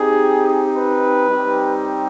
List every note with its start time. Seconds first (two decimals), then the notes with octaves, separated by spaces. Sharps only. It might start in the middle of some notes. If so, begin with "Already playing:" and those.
Already playing: C4 D#4 G4 G#4
0.74 B4
1.29 G3 C4 D#4 G4